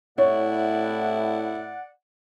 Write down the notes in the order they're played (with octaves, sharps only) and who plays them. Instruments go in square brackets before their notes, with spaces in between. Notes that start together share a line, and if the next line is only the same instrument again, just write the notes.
[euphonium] A2 [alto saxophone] E4 [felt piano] C#5 [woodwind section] D5 F#5